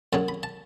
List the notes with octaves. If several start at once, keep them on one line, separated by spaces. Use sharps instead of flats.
F#2 C#3 F#3 A5
B5
A5